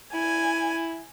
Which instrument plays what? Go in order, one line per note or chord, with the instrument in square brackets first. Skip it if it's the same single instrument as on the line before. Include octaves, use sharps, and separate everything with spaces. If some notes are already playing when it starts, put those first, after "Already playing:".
[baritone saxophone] E4 [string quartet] G#5